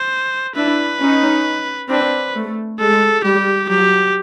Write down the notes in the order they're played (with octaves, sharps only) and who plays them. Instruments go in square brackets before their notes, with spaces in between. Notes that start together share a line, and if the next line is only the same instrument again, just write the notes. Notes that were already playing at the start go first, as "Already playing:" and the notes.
Already playing: [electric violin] C5
[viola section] D4 E4 [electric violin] B4
[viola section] C#4 D#4
[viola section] C4 D4 [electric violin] B4
[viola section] A3
[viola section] G#3 [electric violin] A4
[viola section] G3 [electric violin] G4
[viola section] F#3 [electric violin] G4